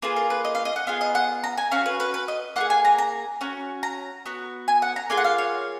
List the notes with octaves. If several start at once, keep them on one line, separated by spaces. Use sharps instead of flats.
A#3 F4 G#4 B4
A#4
B4
D#5
F5
D#5
F#5
B3 F4 G#4 F5
D#5
F#5
A#5
G#5
C#4 F#4 F5
B4
B4
B4
D#5
A#3 F4 G#4 F#5
G#5
A#5
A#5
C#4 F#4
A#5
B3 F#4
G#5
F#5
A#5
A#3 F4 G#4 G#5
F#5
F5
C#5